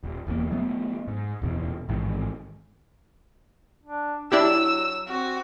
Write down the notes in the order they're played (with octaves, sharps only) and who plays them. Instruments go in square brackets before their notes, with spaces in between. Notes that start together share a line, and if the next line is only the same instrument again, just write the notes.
[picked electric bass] D#1
E1 E2 C3 A#3
F#3 A3 B3
G#2
D1 E2 B2
A1 G#2 D#3
[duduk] D4
[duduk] F#3 [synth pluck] D4 E4 G4 [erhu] E6
[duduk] C4 [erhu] F#4